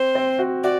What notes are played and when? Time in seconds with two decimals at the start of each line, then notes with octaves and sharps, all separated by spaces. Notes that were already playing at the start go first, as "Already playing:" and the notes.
Already playing: C4 C5
0.15 C4
0.39 F#4
0.63 F#4 D5